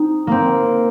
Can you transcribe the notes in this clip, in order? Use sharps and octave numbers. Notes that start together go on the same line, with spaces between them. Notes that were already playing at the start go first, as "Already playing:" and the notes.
Already playing: C4 D#4
A#3 C4